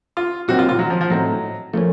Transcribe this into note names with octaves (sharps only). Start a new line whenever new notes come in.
F4
A#2 F#3 C4 D#4 F#4
F4
F4
F#3
F3
F3
A2 F#3 A3 C4 D#4
F3 A3 A#3 C#4